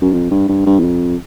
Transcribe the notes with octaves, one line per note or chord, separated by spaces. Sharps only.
F#2
F2
G2
G2
G2
E2
F2